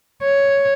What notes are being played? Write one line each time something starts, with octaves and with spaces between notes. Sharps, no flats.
C#5